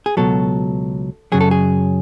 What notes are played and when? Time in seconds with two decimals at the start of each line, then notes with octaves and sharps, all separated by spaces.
0.06 G#4
0.17 C#2 B2 F#3 A4
1.32 F#2 C#3 F#3 G#4
1.41 A4
1.51 G#4